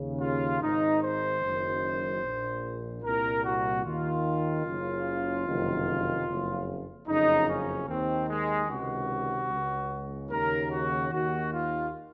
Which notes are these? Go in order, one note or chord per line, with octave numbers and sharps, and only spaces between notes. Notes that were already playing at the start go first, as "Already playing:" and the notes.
Already playing: D#2 C#3
F4
G#1 G#2 D#3 D#4
C5
F#1 F#2 D#3
A#1 A#2
C2 A#2 A#4
F#4
D#2 D#3 F4
F#1 F#2 C#3
F#1 F2 C3 D#3
F#1 F2 C#3
F#1 F2 C#3 D#4
C#4
D#2 D#3 C4
G#3
C#2 C3 D#3 F#4
C#2 C#3
D#2 C#3 A#4
F#4
D#2 D#3 F#4
F4